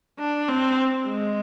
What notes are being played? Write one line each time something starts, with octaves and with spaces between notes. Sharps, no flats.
D4
C4
G#3